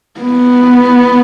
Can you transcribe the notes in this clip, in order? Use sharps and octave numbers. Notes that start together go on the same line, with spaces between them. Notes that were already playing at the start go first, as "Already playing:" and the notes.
B3